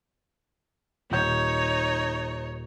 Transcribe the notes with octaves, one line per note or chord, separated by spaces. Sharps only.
D#1 D#4 C#5 G6